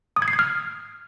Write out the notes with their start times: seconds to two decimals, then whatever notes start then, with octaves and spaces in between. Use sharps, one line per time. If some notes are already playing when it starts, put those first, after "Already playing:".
0.16 D#6
0.22 G#6
0.28 C7
0.33 G#6
0.39 F6